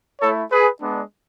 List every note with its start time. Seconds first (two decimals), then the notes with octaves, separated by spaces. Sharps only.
0.21 A3 E4 A4 C#5
0.51 G#4 B4
0.81 G#3 B3 D4